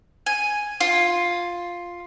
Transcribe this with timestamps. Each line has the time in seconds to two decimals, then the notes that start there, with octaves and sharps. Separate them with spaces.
0.26 G#5
0.81 F4